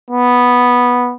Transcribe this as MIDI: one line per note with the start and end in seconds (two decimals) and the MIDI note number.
0.11 1.15 59